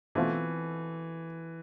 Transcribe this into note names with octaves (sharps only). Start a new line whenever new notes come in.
B2 E3 A3 C4 F4